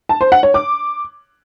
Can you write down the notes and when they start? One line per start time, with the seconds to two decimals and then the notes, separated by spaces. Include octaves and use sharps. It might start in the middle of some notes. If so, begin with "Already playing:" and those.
0.09 A5
0.21 C5
0.32 F#5
0.43 C#5
0.54 D6